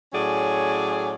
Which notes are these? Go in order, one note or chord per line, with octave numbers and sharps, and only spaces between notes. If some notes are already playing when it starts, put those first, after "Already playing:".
A2 F#3 C#4 G#4 D5